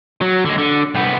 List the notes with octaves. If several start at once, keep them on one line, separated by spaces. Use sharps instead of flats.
F#3
D3 G#3
D3
C2 B3